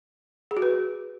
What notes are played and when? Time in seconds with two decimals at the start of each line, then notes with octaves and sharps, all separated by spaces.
0.51 G#4
0.57 F#4
0.62 B4